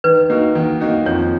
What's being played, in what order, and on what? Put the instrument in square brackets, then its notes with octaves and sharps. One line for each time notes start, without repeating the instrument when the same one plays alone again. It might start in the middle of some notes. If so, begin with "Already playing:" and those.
[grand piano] D#3 [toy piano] B4
[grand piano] A#3 D#4 F#4
D#3
A#3 D#4 F#4
[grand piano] F2 [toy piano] C#5